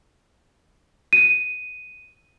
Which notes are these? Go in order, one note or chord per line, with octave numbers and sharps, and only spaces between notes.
D#7